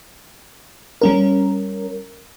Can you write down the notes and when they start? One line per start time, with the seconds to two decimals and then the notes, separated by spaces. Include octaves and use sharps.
1.02 G3 C#4 A#4